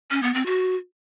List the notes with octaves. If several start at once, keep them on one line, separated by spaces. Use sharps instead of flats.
C#4
B3
C4
F#4